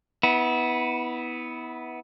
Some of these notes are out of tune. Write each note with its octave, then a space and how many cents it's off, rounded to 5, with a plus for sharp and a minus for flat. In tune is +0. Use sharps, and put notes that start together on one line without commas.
B3 +0 E4 -30